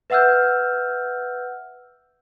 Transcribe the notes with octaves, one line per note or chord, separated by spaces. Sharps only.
B4 E5 F#5 E6 F6 G6